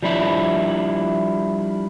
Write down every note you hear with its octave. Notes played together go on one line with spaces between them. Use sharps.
F3 G3 D4 E4